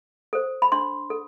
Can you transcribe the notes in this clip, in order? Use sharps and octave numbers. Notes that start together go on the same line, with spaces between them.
A4 C5
B5
D4 C6
A4